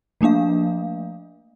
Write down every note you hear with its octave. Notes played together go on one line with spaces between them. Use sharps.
F3 A3 A#3 D4 F5